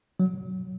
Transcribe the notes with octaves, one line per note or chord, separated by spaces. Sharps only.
F#3